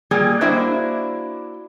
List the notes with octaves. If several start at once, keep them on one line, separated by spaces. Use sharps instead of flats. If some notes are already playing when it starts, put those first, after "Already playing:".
A#2 G3 A#3 G#4 D5
A#3 D4 E4 F#4 C5 E5